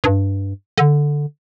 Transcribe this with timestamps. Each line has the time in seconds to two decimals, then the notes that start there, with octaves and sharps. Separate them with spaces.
0.04 G2
0.78 D3